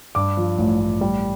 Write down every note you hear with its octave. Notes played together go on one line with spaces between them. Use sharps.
G2 D6
F3
A1
A1
G3